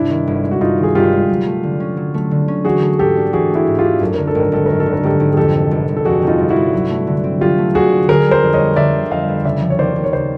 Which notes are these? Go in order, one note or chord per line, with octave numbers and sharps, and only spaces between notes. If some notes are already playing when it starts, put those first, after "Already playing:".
Already playing: G2 C3 C4 D4 E4
D#3
G1
G#3
F#4
G2 D#4 F4
D#3
G#4
G1 F4 G4
G#3
F#3
A3
D3
C#4
F#3
A3
D3
C#4
E3 F#4 G#4
A3
G#2 G4 A4
D4
E3 F#4 G#4
A3
E4 F#4
G#2
F4 G4
D4
F#2 A4
D3 A#4
A4
G#1
A#4
G#1 A4
F#2 A#4
A4
D3
A#4
G#1 G4 A4
G#1
G#4
F2 G4 A4
C3
G1
G1
A4
F2 F#4 G#4
C3
D#4 F4
G1
E4 F#4
G1
F#3
A3
D3
C4
F#3 F4 G4
A3
D3 F#4 G#4
C4
D3 G#4 A#4
G3
A#4 C5
F2
C#5 D#5
B3
D3 D5 E5
G3
F2 D#5 F5
B3
C#3 D5 E5
F3
C#5
D#2 C5 D5
D#2
C#5
C#3 C5 D5